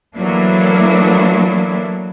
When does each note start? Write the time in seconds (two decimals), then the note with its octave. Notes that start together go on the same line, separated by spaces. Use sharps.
0.15 E3 F#3 A3 A#3 D4 E4